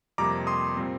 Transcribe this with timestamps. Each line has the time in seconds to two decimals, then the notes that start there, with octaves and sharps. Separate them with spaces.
0.18 F2 C3 G3 A#3 A#5 D6
0.47 C6 D#6
0.77 A#2 G3 C4